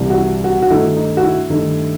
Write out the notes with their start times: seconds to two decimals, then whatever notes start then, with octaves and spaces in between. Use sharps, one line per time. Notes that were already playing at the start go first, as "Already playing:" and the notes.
Already playing: C2 C3 E3 G3
0.10 F#4
0.17 E4
0.44 F#4
0.62 F#4
0.70 G2 D#3 A3 D#4 E4
0.97 D#4
1.17 F#4
1.23 E4
1.50 G2 D#3 A3 D#4